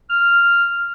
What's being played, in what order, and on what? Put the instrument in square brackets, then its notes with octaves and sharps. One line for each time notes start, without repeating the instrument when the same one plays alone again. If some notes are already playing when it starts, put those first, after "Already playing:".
[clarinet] F6